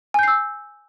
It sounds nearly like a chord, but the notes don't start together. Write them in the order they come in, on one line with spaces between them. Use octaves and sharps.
G#5 G6 C7 E6